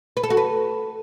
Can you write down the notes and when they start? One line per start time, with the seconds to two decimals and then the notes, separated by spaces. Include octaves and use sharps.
0.17 B4
0.23 A4
0.30 F#4
0.37 B4